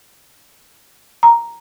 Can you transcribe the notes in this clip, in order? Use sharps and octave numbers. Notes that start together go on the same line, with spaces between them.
A#5